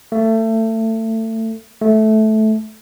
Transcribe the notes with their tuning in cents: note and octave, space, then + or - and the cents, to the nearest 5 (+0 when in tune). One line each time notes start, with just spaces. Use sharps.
A3 +25
A3 -15